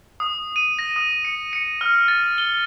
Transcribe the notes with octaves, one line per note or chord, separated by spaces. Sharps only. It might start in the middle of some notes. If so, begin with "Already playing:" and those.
D#6
D#7
A#6
D#6
C#7
C#7
F6
A6
G7